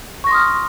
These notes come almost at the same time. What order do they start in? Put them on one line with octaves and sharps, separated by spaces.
C#6 A#6 C6 D#6 F6